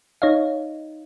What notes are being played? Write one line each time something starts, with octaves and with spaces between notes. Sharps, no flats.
D#4 C#5 D#5 F5